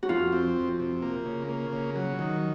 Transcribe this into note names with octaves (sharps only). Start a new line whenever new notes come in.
F#4
F2 F4
C4
F2
C3
A#3
C#3
A#3
C#3
F#3
D#3